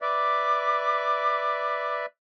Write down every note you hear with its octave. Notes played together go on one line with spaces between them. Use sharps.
B4 D5 E5 D6